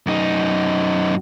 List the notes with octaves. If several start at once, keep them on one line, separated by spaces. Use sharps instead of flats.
F#2 D#4